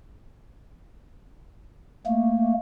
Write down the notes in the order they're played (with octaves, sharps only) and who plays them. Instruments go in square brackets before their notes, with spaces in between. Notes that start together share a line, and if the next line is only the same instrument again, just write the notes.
[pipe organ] A3 A#3